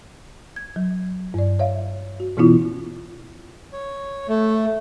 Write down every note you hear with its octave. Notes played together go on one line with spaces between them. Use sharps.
G#6
F#3
G2 D5
C#5 E5 F5
F#4
B2 E3 B3 C#4 E4 F4
C#5
A3